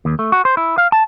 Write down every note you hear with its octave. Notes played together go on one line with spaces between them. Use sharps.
D#2
A3
F#4
C5
E4
F5
A5